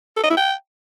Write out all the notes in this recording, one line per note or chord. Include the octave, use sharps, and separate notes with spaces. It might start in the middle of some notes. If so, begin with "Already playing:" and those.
A4
D#5
E4
G5